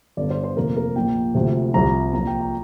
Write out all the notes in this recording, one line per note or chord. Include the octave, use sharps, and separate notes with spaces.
G1 G2 D3 D5
C5
C5
F1 F2 C3 A#3 A#4
A#4
A#1 A#2 A#3 G5
D2 C3 F3
C2 C3 F3 A#5
A#1 A#2 A#3 A#5
G5
A#5